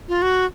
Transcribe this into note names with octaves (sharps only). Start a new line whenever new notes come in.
F4
F#4